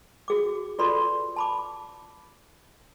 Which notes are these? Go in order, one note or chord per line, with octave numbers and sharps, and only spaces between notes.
F#4 G#4 D6
F4 A4 B4 D5 B5 C6
A5 B5 D6